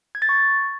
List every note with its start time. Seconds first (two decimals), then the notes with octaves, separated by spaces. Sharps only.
0.15 G#6
0.22 A6
0.29 C#6